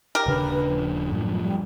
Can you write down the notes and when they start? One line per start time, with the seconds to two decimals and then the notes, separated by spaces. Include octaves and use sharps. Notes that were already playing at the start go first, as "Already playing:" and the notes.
0.15 G4 A#4
0.26 D#1 C#3 D4 B4
0.68 F3
1.11 F#2 A2 F3 G3
1.40 G3